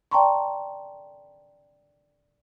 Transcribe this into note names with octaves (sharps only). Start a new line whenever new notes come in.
D5 G5 A5 A#5 C6 C#6